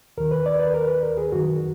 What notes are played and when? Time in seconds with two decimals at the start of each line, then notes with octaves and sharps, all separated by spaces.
0.17 D#2 D#3 A#4
0.31 B4
0.46 D5
0.59 B4
0.74 A#4
0.88 B4
1.03 A#4
1.17 G#4
1.32 F#2 D#3 F#4